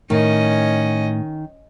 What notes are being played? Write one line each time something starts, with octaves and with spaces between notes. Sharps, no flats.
A2 D#3 C#4 D#5